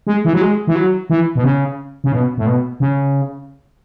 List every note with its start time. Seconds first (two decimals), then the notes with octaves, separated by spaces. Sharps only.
0.07 G#3
0.25 E3
0.33 F#3
0.41 G#3
0.67 E3
0.75 F#3
1.10 E3
1.36 B2
1.44 C#3
2.04 C#3
2.12 B2
2.38 A2
2.46 B2
2.80 C#3